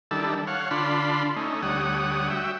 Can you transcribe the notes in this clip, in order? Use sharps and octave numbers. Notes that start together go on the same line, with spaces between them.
D#3 G3 D4 E4 A4
C#5 F5 F#5
D3 D4 F4 B5 C6
A3 C#4 D#4
D2 G3 C#5 F#5 D#6
F#4 E5 G5